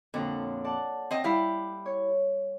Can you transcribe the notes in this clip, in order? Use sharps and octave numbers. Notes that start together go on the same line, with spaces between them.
F2 A#2 D3 F#3
D5 F#5 A5
C4 D#5
G3 E4 G4 F5
C#5